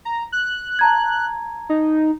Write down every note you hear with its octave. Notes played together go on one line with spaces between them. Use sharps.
A#5
F#6
A5 A#5 G#6
D#4